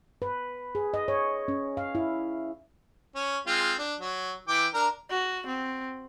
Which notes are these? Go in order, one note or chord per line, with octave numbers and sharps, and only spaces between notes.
B4
G#4
D#5
C#5
C#4
F5
E4
C#4
G#3 C4 F4
D4
F#3
E3 G5 D6
D4 A#4 A#5
F#4
C4